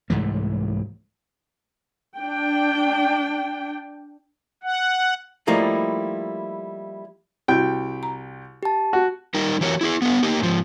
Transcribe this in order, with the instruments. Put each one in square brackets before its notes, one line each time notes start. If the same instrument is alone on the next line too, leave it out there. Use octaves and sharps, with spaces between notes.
[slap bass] C2 G#2 E3 A3
[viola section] D4 G5
[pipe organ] F#5
[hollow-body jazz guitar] F3 G3 A3 A#3 D#4 E4
[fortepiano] C2 G5 [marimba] E4 F#4
[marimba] A#5
[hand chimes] G4 A5
[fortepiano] F#4
[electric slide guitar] G3 D#4 A#4
E3 F#3 G4 A#4 C#5
E4 G4 G#4
B3 D4 A4
A#3 D#4 G4
G#2 F3